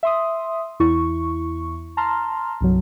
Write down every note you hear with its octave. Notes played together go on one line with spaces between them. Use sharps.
E5 C6 D#6
E2 E4 C#6
A5 A#5 C6 F6
C2 G2 F#3